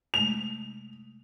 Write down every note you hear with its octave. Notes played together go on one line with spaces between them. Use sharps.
C3 G#3 A3 F7